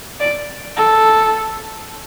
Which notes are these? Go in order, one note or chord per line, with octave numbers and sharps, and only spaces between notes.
D5
A4